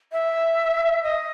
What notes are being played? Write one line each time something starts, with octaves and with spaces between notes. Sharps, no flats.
E5
D#5